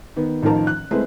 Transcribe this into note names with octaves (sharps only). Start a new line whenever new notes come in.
D#3 B3
A1 D#3 F3 D#4 A#4 A5
F#6
G#3 A3 C4 E4 G#4 B4